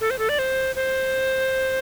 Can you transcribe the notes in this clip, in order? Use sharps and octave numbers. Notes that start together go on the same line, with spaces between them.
A4
C5
A4
D5
C5
C5